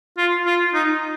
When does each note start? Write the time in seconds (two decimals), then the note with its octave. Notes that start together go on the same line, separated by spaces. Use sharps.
0.17 F4
0.46 F4
0.74 D#4